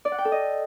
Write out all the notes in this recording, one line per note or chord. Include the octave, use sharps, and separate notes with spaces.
D5
F#5
G5
A4
D#5